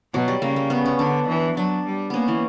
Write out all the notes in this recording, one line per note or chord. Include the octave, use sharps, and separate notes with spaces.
B2 F#3
G3
C#3 A#3
A#3
B3
C#4
D3 D4
E3
F#3 D4
G3
A#3 B3 C#4
E3